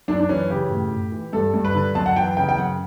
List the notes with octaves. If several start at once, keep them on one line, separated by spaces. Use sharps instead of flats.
F#2 D4
D4
E3 C#4
C#3 G4
A2
A2
E3
G2 A4
G2
B4
D3
F#2 A5
F#5
E3 G5
C#3 G5
G5
F#2 F#5